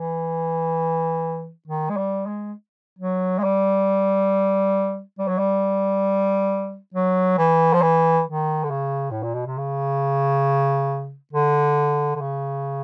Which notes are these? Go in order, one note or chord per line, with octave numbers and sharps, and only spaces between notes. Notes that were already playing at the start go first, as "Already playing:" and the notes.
Already playing: E3
D#3
G#3
G3
G#3
F#3
G#3
G3
G3
F#3
G3
F#3
E3
F3
E3
D#3
D3
C#3
A2
A#2
B2
C3
C#3
D3
D3
C#3